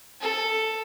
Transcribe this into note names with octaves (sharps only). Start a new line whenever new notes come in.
A4